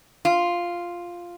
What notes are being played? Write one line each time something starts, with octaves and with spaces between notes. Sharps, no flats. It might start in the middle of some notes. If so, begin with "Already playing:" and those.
F4